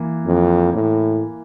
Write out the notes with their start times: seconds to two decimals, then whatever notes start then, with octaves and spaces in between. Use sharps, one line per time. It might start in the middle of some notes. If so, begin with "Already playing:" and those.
Already playing: E3 A#3
0.26 F2
0.73 A2